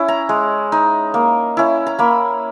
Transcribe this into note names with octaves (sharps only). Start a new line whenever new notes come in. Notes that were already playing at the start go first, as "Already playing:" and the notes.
Already playing: C#4 E4
A#5
G#3
D#4
A#3
C#4 E4
A#5
A#3 B5